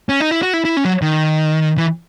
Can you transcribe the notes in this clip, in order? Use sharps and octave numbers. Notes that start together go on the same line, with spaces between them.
C#4
D#4
E4
F#4
E4
E4
C#4
F#3
D#3
E3